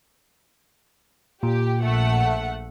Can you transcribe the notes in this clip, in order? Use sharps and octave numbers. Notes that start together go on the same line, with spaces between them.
A#2 G4
A#1 A3 F#5